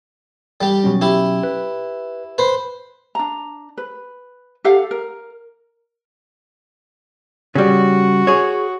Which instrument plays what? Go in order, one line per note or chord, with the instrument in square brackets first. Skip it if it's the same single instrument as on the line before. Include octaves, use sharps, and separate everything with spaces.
[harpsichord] G3 G4
[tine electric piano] B2 F#3 C#4
[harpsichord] E4 G4
[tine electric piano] B4
[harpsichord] B4 C5
[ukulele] D4 A#5
B4
G4 A4 F5 F#5
A#4
[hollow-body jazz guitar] C#3 G3 [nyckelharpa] F#4
[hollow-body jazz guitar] G#4 C#5